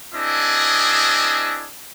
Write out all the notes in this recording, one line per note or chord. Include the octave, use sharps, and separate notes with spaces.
C4 D4 E4 G#4 D#5